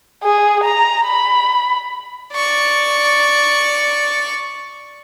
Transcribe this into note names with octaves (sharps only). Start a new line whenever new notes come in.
G#4
A#5
B5
D5 C#6